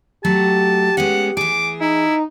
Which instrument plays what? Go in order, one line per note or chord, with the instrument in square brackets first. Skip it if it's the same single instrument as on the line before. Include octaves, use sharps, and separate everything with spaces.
[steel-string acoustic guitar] F#3 A3 F#4 [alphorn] G4 [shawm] A5
[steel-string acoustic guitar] G#3 B3 C#4 [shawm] F#5
[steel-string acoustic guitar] E3 G#4 [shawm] D6
[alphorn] D#4 [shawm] E4